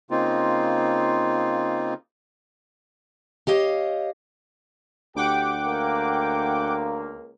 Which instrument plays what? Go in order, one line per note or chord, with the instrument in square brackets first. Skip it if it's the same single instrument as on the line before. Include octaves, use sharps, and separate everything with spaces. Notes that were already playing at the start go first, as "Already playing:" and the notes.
[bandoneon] C#3 A#3 C4 D#4 F4
[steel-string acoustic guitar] G4 C#5 D#5 F5
[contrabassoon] D2 [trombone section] G4 [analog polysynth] F#5 G5 D6
[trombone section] C#2 A#3